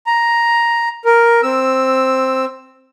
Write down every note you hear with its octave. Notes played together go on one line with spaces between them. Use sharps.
A#5
A#4
C4 E6